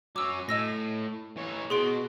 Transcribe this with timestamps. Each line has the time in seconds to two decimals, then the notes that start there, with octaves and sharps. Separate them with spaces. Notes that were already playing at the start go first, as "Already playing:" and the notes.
0.16 F#3 C#4 D6 E6
0.49 A2 D#5 E6 A#6
1.36 E3 C#5
1.70 B2 B3 G#4 C6 D7